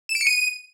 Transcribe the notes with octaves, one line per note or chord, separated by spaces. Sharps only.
E7
D7
C#7
D#7